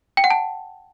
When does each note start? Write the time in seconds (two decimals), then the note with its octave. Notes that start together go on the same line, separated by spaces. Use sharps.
0.17 G5
0.24 F#5
0.30 A5